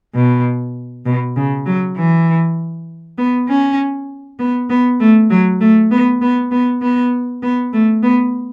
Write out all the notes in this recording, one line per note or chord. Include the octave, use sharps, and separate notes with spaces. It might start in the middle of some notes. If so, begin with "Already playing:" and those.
B2
B2
C#3
F#3
E3
B3
C#4
B3
B3
A3
F#3
A3
B3
B3
B3
B3
B3
A3
B3